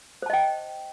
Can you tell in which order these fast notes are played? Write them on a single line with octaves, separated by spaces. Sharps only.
C5 A5 D#5 G5